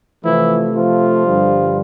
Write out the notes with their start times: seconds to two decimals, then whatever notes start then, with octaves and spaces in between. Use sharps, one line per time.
0.24 C3 E3 F3 A3 E4
0.75 F3 F4
1.25 G2 D3 G3